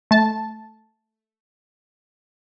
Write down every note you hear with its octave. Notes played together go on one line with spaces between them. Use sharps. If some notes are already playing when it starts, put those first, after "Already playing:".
A3 A5